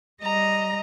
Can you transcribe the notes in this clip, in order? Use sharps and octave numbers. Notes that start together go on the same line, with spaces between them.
G3 D#5 A#5